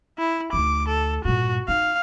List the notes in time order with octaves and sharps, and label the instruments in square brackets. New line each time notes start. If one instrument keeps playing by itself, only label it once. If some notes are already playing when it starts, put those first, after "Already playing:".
[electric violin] E4
[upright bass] D2 D#4 [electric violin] D6
[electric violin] A4
[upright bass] G2 A#2 [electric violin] F#4
[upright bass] D#4 [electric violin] F5